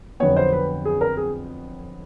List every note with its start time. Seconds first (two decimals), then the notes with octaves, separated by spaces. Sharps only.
0.20 F2 D3 F#3 B3 C#5
0.37 C5
0.53 B4
0.85 G#4
1.01 A#4
1.17 G#4